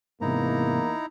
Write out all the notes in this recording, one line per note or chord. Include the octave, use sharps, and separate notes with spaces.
E2 G#2 C3 A#3 D#4 E4 A#5